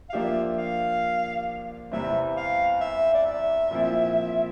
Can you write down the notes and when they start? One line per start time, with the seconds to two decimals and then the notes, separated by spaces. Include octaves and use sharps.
0.09 F5
0.12 F3 A#3 D4 G4 E5
0.58 F5
1.92 E2 C3 E3 G3 C4 E5
2.36 F5
2.81 E5
3.14 D5
3.25 E5
3.71 A#2 F3 C4 E4